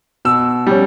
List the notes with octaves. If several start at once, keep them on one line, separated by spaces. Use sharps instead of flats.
B2 E6
G3 C#4